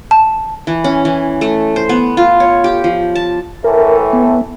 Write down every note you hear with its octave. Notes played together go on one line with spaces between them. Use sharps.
A5
E3
C#4
E3
A3
C5
B3
F4
C#5
G4
F3
A5
A2 E3 A3 A#4
B3